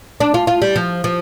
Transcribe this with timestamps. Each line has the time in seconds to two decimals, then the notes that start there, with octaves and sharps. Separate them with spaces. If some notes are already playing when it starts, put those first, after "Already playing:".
0.20 D4
0.34 F4
0.47 F4
0.62 G3
0.76 F3
1.04 F3